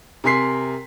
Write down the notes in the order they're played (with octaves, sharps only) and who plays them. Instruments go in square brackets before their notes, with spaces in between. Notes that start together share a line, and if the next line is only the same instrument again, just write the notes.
[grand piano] C3 A#4 G#5 C6 B6 C7